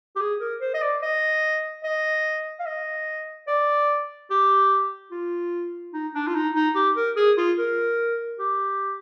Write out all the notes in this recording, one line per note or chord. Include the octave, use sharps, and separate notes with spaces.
G4
G#4
A#4
C5
D#5
D5
D#5
D#5
F5
D#5
D5
G4
F4
D#4
D4
F4
D#4
D#4
G4
A#4
G#4
F4
A#4
G4